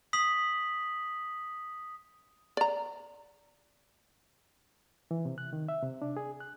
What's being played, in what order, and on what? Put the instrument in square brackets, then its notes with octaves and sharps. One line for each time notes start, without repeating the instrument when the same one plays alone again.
[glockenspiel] D#6 B6 F#7
[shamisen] D5 A#5
[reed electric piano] E3
C3
F#6
D#3
E5
C3
D4
G#4
F#6